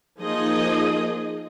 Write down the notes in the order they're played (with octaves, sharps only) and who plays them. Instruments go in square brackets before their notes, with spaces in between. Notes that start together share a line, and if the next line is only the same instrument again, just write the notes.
[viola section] F3 A#3 D#4 G#4 D#5